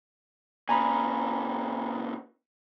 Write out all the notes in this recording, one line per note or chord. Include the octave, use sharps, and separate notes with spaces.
A#2 C#3 G#5 A#5 B5